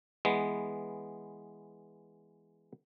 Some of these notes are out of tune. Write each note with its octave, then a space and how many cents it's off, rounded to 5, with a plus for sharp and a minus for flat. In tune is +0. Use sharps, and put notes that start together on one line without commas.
E3 +0 G#3 +0 B3 +0